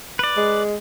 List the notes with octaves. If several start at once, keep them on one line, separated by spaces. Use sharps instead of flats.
B4 D5
G#3